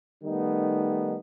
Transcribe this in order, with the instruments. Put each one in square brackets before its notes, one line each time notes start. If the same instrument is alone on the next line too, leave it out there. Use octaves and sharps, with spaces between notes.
[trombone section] D#3 G3 A3 B3 D#4